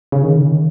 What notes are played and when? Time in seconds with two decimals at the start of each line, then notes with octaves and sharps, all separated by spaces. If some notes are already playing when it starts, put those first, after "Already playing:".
0.12 C#3
0.24 D#3
0.36 C#3
0.47 D#3